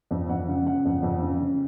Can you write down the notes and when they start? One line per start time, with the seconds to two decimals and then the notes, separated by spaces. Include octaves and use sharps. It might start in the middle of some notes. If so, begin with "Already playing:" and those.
0.11 F2
0.29 F2 F#5
0.48 C#3
0.66 C#3 F#5
0.85 F2
1.03 F2
1.22 C#3
1.40 C#3